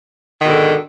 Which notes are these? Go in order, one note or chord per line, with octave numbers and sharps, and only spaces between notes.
G#2 B2 D3 D#3